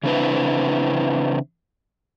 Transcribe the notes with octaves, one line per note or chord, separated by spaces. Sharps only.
C#3 E3 C4 D4 E4 B4